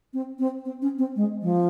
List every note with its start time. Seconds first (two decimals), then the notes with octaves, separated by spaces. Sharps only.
0.14 C4
0.39 C4
0.65 C4
0.82 C#4
0.98 C4
1.16 G#3
1.42 F3